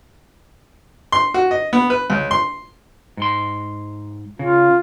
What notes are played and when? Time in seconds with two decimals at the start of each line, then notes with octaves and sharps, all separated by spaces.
1.12 C6
1.34 F#4
1.51 D#5
1.73 B3
1.90 B4
2.10 C#2
2.31 C6
3.17 G#2 C6
4.39 C#3 F4